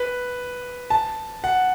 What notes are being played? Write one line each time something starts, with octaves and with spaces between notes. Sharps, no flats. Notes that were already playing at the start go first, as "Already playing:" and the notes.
Already playing: B4
A5
F#5